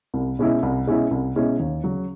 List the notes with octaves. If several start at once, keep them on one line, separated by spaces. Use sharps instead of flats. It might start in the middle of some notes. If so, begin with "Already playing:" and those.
C2
B2 G#3 C#4 E4
C2
B2 G#3 C#4 E4
C2
B2 G#3 C#4 E4
D#2
C#3 F#3